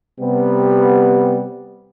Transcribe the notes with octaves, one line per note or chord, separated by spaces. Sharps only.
C3 G3 B3